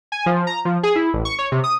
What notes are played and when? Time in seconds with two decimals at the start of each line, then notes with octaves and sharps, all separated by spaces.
0.12 G#5
0.26 F3
0.47 A#5
0.65 F3
0.83 G#4
0.96 E4
1.13 A1
1.25 C#6
1.39 C#5
1.52 C3
1.64 D#6